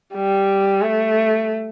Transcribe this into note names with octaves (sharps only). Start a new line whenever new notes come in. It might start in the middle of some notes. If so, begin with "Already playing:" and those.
G3
A3